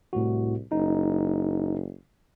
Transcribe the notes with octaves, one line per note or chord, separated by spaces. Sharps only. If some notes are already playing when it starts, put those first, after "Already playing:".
C2 A2 F#4
F#1 D#4